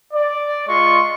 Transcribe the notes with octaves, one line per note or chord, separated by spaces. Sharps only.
D5
G#3 F4 D#5 C6 C#6